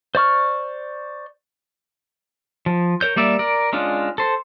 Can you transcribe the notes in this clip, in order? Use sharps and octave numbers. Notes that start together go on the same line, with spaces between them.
C5 D5 C#6 F6
F3
A#4 C#5 G6
G3 A#3 D5 E5
A#4 D5
G#3 C#4 D4 F4
A4 C5